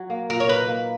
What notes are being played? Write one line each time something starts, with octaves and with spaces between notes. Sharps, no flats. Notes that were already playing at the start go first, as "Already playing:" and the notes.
Already playing: F#3
A#3
A#2 A#4
C#5
D#4 B4
A#3